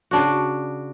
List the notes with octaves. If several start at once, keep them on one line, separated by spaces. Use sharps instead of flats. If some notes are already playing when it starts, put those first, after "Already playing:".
C#3 D4 F#4